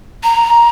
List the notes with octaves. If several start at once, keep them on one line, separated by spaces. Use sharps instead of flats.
A#5